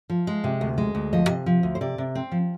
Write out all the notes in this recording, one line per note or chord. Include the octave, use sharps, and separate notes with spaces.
F3
G#3
C3
D2
G#3
D2
F3 D#5
C3
F3
D2
C5
C3 D5
C3
C4
F3